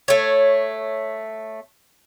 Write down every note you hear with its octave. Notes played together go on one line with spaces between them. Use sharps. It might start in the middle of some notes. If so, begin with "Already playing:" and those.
A3 C#5